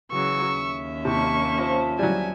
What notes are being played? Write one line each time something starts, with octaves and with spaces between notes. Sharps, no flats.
C#3 E3 F#3 C#6 E6
D#2 C#4 E5
C3 A#3 A5 C#6
F3 D#5
F#3 G3 G#5